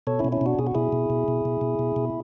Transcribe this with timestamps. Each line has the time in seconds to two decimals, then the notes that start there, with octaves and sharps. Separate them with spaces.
0.07 B2 A4 C#5
0.19 C#4 E4
0.25 B2
0.32 C#4 E4
0.41 B2 D4 F#4
0.59 B2 G#4
0.67 F#4
0.75 B2 E4 G#4
0.92 B2
1.10 B2
1.28 B2
1.45 B2
1.61 B2
1.79 B2
1.96 B2